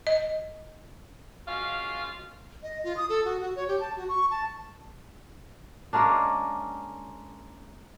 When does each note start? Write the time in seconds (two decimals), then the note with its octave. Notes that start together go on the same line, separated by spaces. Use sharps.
0.07 D#5
1.47 G#3 A#3 C#4 F4 F#4 F5
2.63 D#5
2.84 F4
2.97 D#6
3.09 A4
3.25 F#4
3.40 F#4
3.56 C#5
3.68 G4
3.80 A5
3.97 F#4
4.09 C#6
4.31 A5
5.93 G#3 A#3 C#4 D4